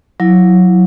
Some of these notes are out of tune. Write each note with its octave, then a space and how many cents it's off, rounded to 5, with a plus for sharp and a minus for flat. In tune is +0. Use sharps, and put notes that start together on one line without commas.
F#3 -20 E4 +0